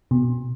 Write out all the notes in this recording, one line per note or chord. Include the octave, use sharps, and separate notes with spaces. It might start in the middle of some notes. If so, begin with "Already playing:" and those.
B2